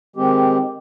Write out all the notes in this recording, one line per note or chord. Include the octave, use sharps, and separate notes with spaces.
D#3 G#3 C4 G4